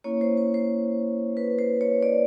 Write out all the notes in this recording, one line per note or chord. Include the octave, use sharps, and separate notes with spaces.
A#3 C#4 E4 C#5
C5
C5
C5
B4
C5
C#5
D5